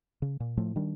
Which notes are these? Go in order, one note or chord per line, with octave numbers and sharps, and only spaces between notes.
C#3
A#2
A2 F3 A3
D#3 G3 D4